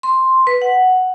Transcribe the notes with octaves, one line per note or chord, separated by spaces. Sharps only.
C6
B4
F#5